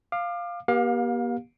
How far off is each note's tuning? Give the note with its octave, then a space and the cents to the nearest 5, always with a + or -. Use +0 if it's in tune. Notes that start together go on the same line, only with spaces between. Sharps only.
F5 +0 D6 +35
A#3 +45 G4 +0 F5 +25